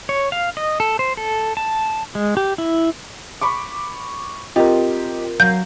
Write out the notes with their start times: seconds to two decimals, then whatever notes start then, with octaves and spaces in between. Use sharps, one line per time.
0.09 C#5
0.32 F5
0.57 D#5
0.80 A4
0.99 C5
1.17 A4
1.57 A5
2.15 G#3
2.37 G4
2.58 E4
3.41 B5 C#6 D6
4.56 C4 F4 G4 A#4 D#5
5.40 F#3 F5 G6